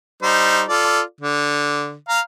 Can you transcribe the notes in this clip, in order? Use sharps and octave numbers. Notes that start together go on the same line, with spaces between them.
G3 D#4 C5
F4 A4 D5
D3
F5 A#5